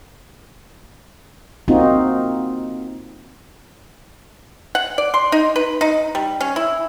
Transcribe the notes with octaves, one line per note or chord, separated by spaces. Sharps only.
A#3 C4 D#4 F4 F#4
F#5
D5
C6
D#4
B4
D#4
G3
C#4
E4